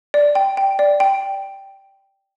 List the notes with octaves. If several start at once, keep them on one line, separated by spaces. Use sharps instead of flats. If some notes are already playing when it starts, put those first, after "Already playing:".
D5
G5
G5
D5
G5